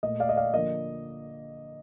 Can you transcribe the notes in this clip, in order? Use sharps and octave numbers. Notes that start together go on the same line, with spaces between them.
A#2 A3 D#5
D5 F5
D#5
D5 F5
D3 F3 A#3 D#5